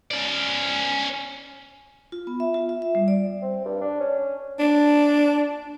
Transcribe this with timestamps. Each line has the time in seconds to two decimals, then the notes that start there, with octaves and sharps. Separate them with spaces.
0.11 C#4 D5
2.12 F4
2.27 B3
2.40 E5
2.54 F4
2.69 E5
2.82 E5
2.95 G3
3.08 D5
3.42 C4
3.65 G2
3.81 D4
4.00 C#4
4.59 D4